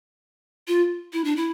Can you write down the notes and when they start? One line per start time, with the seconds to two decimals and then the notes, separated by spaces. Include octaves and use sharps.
0.68 F4
1.13 E4
1.24 D4
1.37 E4